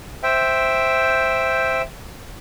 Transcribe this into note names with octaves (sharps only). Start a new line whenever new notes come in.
C5 E5 G5